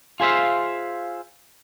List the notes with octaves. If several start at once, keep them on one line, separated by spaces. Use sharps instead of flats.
F4 G#4 C5 E5 F5